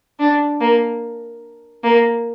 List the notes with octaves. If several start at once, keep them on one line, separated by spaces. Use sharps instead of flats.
D4
A#3
A#3